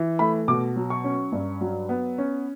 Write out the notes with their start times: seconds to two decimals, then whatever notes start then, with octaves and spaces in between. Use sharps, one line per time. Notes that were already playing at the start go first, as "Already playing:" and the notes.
Already playing: E3
0.19 A3 B5
0.48 B2 D6
0.76 F#3
0.90 C#6
1.04 C#4
1.32 G2
1.61 F#3
1.89 B3
2.18 C#4